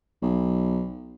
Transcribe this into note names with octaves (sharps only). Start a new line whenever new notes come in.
B1